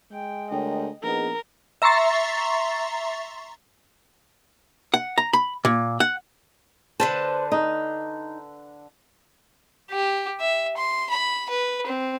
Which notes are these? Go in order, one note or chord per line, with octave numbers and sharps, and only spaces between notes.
G#3 G5
D2 A#4 C#5 D#5 G5
A#1 B3 D#4 G#4 A#4
E5 A#5 C6 C#6 A6 C7
F#5
A#5
B5
A#2
F#5
D3 B4 C5 A5
D#4
G4
E5
C6
B5
B4
C4